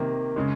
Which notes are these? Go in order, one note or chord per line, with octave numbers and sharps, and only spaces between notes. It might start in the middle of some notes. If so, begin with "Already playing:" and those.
Already playing: C3 D#3 A#3
C#3 G#3